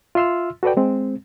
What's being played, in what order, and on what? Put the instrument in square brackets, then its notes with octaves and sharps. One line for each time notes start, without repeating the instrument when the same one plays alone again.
[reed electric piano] F4 E5 C6 E6 F6
F#4 A4 B4 D5 G5
G#3 C4